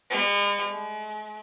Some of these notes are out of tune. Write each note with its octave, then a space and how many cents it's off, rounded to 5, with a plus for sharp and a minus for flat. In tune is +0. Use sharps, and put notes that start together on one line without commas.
G#3 -45
G#3 +45